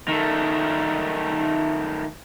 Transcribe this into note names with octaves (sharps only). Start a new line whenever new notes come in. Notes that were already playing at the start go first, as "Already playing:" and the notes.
D#3 A3